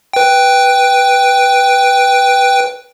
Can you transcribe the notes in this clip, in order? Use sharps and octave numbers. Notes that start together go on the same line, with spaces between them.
B4 G5